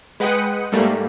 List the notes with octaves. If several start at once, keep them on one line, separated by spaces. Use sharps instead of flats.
G#3 B4 F#5 G5 D#6 C#7
G#2 G3 A3 A#3